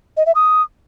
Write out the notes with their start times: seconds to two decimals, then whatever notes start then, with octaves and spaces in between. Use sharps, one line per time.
0.17 D#5
0.26 E5
0.35 D#6